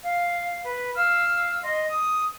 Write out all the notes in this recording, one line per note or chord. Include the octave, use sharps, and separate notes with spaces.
F5
B4
F5 E6 F6
D#5 C6
D#6